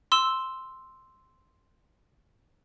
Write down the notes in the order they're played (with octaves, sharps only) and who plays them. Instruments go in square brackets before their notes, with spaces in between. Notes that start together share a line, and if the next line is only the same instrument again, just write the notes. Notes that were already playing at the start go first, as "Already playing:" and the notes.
[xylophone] C6 E6 E7